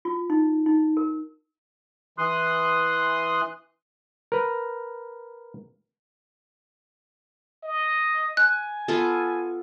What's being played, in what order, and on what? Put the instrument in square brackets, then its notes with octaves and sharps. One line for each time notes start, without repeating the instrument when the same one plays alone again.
[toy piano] F4
D#4
D#4
A#4
[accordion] E3 C6 D#6 F#6
[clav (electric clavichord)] A#4 B4
[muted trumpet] D#5
[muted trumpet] G#5 [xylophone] F#6
[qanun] B3 F4 A4